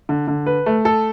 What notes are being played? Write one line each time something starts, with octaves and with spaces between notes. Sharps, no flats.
D3
D3
B4
A3
A4